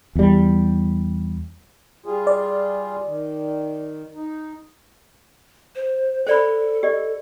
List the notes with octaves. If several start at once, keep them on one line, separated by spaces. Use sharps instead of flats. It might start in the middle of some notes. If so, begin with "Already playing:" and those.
E2 G3
G3 F4 G#4
D5
D#3
D#4
C5
A4 C5 D5 B5
G4 D5 D#5